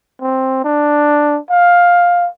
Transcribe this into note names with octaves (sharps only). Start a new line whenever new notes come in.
C4
D4
F5